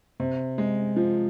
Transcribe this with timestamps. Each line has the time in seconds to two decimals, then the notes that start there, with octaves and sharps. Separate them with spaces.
0.20 C3
0.58 G#3
0.96 F3